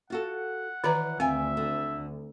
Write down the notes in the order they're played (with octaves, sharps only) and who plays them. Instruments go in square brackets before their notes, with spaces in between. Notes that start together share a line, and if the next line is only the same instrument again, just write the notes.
[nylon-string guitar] F4 F#4 A4 [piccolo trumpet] F#5
[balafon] D#3 B4 A#5 [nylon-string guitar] E3 C#5 D5
[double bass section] D2 [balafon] C4 F5 [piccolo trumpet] E5 [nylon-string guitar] G5 G#5
[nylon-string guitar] D3